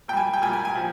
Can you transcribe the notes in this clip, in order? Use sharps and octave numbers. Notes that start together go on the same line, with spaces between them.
A#2 G3 G5 G#5
G5
A#2 G3 G#5
G#5
G#5
A#2 F3